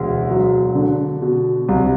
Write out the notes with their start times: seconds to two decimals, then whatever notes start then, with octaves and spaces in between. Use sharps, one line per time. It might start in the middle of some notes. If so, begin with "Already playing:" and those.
Already playing: E1 D2
0.30 F#3
0.75 D3
1.22 B2
1.68 C2